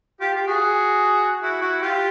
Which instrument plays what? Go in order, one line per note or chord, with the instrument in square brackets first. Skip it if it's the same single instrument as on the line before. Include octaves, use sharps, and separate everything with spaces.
[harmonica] F4 G4
F4 G4
F#4 G#4
E4 F#4
E4 F#4
F4 G4